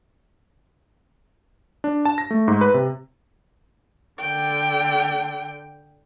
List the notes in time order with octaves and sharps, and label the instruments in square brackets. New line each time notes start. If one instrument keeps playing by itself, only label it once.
[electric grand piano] D4
A5
A#6
A3
G#2
B4
C3
[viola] D3 G5